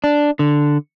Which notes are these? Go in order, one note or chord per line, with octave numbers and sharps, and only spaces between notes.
D4
D3